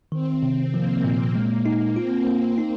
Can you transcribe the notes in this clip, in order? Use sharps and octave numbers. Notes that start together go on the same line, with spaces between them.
D#3 C4
C3
F3 A#3
A#2
G#3 A#3
A#3 D#4
C4 F4
A#3
D#4